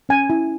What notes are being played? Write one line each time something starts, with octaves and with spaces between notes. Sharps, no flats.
C#4 G#5
E4